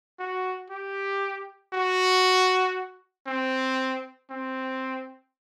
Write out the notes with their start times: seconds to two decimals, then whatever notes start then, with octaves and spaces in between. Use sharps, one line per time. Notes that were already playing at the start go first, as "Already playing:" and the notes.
0.19 F#4
0.70 G4
1.73 F#4
3.27 C4
4.31 C4